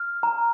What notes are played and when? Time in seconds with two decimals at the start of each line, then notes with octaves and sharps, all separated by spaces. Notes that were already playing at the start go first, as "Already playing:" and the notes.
Already playing: F6
0.23 A#5